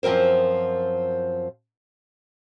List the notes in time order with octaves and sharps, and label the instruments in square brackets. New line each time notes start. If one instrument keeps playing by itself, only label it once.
[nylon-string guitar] F#2 F3 C4 A#4 C5